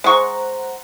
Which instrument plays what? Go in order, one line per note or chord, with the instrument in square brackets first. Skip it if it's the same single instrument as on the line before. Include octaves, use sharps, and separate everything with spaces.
[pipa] G#3 C#6 [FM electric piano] C5 F#5 A#5